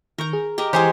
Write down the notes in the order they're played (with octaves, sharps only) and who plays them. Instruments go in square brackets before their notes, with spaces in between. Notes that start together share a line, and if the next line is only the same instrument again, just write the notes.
[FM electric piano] D#3 C#6 G6 [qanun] A#4 A#5
[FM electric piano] G#4
[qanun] G4 A#4 D#5
[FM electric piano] E3 [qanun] G#3 G#4 C#5 [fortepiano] G4 C5 G#5